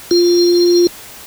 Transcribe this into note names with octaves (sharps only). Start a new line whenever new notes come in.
F4